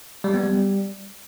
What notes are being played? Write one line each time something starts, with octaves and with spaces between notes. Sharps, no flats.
G3
B3
G3